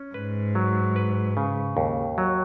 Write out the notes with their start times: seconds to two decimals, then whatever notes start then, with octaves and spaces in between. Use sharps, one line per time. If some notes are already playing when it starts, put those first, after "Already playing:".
Already playing: C#4
0.14 G#2 B4
0.55 F#3
0.96 B4
1.37 C#3
1.77 D#2
2.18 F#3